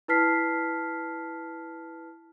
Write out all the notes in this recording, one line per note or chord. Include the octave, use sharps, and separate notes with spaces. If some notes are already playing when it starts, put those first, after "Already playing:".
E4 B4 A5 F6 B6 C7